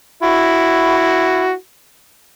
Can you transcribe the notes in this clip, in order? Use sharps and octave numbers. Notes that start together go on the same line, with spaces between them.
E4 F#4